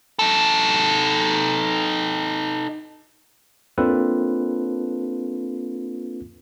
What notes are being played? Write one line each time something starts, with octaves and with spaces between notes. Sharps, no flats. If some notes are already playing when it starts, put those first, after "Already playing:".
D#4 A4
A#3 C4 D4 F4 A4 B4